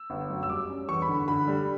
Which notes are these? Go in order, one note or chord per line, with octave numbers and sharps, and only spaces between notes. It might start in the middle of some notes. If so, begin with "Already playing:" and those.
Already playing: E6
G1
F#2
E6
G3 D6
C#4
E2 C#6
B5
D3
D3 B5
G3